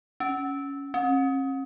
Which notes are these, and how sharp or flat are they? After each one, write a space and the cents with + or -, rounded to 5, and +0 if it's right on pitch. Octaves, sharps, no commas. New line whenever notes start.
C#4 +10
C#4 -45